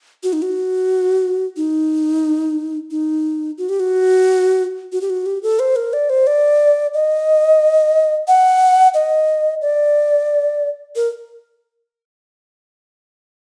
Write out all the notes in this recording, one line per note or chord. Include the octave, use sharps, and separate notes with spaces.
F#4
D#4
F#4
D#4
D#4
F#4
G4
F#4
F#4
G4
F#4
G4
A4
C5
A#4
D5
C5
D5
D#5
F#5
D#5
D5
A#4